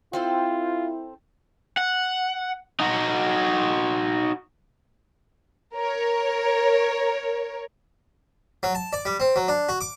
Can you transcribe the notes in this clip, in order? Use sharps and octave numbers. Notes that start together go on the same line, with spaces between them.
C4 E4 F4 A4 C5
F#5
D#4 F#4
A#4 C#5
F#3
A5
D5
G3
C4
F#3
D4
F#4
D6